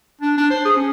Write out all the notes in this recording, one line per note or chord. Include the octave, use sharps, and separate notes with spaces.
D4
D4
C5
G#4
C#4